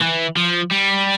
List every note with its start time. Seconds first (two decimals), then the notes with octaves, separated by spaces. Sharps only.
0.02 E3
0.37 F3
0.71 G3